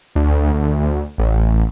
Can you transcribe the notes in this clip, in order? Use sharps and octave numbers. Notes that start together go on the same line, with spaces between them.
D2
D2
A1